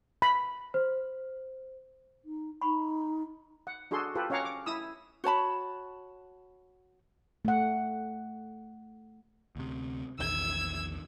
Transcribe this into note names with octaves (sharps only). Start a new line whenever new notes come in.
B5
C5
D#4
D#4 B5 C#6
F#5
D4 F#4 G#4 A4 C6
F4 G4 A4 B4
C#4 C#5 F5 F#5 A#5 D6
D6
E4 D#6 E6
F#4 C#5 A5 B5
A3 F#5
D2 C3
A#1 E2 D#3 E6 G#6